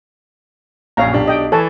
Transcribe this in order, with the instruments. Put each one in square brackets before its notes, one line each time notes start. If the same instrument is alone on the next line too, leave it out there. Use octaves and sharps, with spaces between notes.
[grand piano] A#1 F#2 [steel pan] C#5 F5 A#5
[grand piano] B1 D4 G4
[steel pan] D#5 G5
[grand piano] E3 [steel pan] A4 C#5 A5